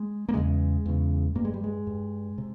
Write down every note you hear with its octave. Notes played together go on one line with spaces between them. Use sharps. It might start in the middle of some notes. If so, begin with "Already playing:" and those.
Already playing: G#3
A#3
E2 C#3 G#3
E2 C#3
G2 A#3
G#3
G3
G#3
G2
C3